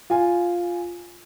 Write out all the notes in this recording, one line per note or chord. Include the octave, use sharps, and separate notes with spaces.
F4 G#5